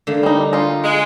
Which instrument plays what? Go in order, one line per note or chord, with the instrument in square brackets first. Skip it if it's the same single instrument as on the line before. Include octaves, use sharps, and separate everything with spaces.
[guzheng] D3 A3 A#3
[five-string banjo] G3 D#4
D#4 F4
[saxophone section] G#3